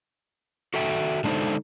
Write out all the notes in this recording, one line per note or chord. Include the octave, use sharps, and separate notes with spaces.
F#4 A4 E5 G5
D3 G#3 D4 D#4 A4 C5